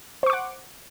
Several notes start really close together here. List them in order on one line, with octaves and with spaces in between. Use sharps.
C5 C#6 D6 F#5